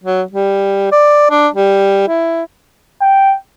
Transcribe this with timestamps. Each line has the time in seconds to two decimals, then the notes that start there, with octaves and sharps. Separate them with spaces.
0.03 F#3
0.32 G3
0.92 D5
1.30 D4
1.54 G3
2.08 E4
3.01 G5